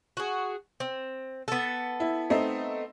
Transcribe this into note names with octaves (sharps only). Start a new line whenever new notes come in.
F#4 G#4
C4
B3 A4
E4
A3 C4 D#4